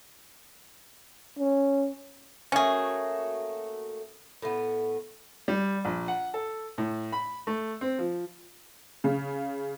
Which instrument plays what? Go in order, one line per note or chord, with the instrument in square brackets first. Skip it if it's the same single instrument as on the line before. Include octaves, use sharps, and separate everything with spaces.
[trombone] C#4
[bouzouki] A3 A#3 F#4 [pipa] C#4 G#4
[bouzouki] A2 B3
[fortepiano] G3
A#1
F#5
A4
A2
B5
A3
C4
F3
[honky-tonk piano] C#3